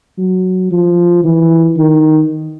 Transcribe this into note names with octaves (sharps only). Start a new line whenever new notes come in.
F#3
F3
E3
D#3